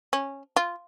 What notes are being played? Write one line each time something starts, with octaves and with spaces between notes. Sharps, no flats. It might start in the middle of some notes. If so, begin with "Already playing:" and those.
C#4
F4